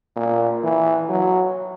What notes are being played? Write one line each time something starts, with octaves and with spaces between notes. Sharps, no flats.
A#2
E3
F#3